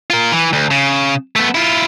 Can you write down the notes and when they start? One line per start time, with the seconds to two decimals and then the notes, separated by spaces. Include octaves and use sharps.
0.10 F4 A#4
0.32 E3
0.53 D2
0.71 C#3
1.36 A3 B3
1.55 E4 F4